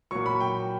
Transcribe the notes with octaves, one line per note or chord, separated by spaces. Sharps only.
A#2 F#3 C#6
B5
G5